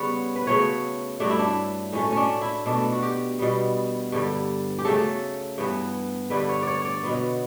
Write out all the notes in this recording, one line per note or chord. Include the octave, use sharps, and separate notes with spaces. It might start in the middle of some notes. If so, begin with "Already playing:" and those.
Already playing: C#3 G3 B3 B4 C#5
B4
C#3 F#3 A3 C#5
G2 F#3 A3 D4
E4
D4
A2 F#3 A3 C#4
C#4 D4
E4
B2 A3 D4
F#4
G4
B2 G3 B3
G2 D3 G3
G4
C#3 F#3 A3 A4
G2 E3 B3
G2 D3 G3 B4
C#5
C#5 D5
C#5 D5
B2 F#3 B3